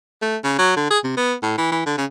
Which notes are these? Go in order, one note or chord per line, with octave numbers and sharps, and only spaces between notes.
A3
C#3
F#3
D3
G#4
C3
B3
A2
E3
E3
D3
C#3